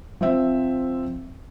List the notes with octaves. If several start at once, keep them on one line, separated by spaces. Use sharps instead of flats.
F3 C4 E5